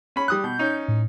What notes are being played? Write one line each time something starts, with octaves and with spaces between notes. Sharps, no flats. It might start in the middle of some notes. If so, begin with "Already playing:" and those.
C#4 B5
G3 D#6 F#6
B2 G6
C#4 D#4
A2